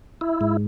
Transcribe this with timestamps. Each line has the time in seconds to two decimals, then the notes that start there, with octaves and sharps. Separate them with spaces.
0.21 E4
0.41 G#2